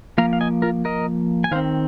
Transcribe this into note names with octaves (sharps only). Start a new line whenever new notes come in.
F3 A#3 F5 A#5
F5
D#5 G#5
F4 A#4
A#4 D#5
G#5
D#3 C4 C5 F5